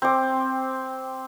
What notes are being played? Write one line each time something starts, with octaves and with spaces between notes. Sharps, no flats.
C4 D6